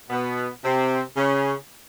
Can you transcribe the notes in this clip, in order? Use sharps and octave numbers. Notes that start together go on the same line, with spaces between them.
B2 B3
C3 C4
C#3 C#4